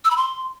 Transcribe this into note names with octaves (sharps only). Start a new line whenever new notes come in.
E6
B5
C6